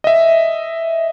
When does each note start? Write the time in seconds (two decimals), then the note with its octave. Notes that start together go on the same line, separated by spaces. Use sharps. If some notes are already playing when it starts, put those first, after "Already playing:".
0.04 D#5 E5